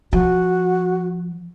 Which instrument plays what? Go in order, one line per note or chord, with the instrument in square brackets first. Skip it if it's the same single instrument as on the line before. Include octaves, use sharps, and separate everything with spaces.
[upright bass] F3 [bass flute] F#4